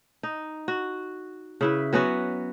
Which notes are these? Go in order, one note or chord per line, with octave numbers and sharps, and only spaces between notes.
D#4
F#4
C#3 E4 B4
F#3 B3 C#4 F#4